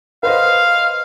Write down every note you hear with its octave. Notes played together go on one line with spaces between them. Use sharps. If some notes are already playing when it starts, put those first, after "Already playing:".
B4 C5 D#5 F5